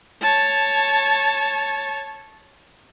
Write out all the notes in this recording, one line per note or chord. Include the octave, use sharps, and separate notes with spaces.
C#5 A5